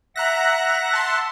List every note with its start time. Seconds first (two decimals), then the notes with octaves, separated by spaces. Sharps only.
0.16 E5 F#5 A#5 F#6 A#6
0.93 A5 C6